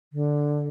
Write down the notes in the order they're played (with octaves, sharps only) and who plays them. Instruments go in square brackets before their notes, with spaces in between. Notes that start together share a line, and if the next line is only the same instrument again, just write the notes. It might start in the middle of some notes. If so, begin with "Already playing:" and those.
[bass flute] D3